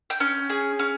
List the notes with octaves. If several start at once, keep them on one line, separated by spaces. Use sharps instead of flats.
G5
C#4
G#4
C#4